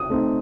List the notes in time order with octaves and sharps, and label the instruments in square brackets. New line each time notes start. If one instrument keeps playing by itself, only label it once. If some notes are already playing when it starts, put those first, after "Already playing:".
Already playing: [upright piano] D#6
[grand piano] A3 C4 D#4